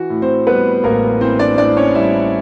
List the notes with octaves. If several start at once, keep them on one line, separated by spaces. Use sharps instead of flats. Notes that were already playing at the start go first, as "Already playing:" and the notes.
Already playing: E3 F#4
A2
C4 C5
G3 B3 B4
A1 A#3 A#4
E3 C4 C5
D4 D5
A2 D4 D5
C#4 C#5
G3 E4 E5